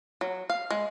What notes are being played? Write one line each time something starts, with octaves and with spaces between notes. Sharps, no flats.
F#3
F5
G#3